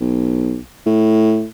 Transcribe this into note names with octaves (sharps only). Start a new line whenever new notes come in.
B1
A2